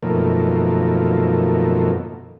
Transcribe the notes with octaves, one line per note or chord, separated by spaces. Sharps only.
F#2 B2 D#3 F3 A3 A#3